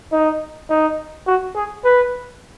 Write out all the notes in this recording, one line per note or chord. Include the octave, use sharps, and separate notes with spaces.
D#4
D#4
F#4
G#4
B4